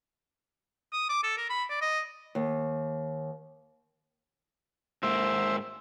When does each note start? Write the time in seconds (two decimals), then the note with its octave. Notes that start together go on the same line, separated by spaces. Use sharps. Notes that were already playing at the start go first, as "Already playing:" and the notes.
0.93 D#6
1.10 D6
1.23 A4
1.38 A#4
1.50 B5
1.70 D5
1.82 D#5
2.35 D#2
5.03 G#2 A#3 C5 E5